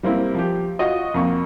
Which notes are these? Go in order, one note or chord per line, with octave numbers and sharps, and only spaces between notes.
G3 A#3 C4 E4
F3 G4
F4 F#4 D#5
F2 A#3 C#6